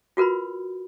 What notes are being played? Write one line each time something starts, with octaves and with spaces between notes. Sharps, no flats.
F4 F#4 A#4 B4 B5